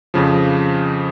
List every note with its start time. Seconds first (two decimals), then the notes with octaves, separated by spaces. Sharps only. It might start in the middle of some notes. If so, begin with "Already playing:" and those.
0.14 F2 C#3 F3